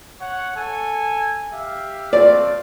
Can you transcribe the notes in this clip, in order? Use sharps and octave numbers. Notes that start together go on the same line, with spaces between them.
C#5 F#5
A4 G#5
G4 E5 F5
A3 C4 D5 F5